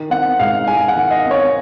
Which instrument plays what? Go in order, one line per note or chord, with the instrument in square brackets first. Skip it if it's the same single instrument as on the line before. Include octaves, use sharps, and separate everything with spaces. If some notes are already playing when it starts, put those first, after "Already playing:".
Already playing: [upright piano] D#3
C4 F#5
G#2 F5
G#3 G#5
F#5
D#3
D#5
C4
C#5